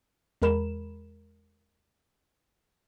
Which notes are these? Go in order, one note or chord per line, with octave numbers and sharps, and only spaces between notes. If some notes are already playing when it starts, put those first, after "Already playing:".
E2 G#3 A#4 B5 E7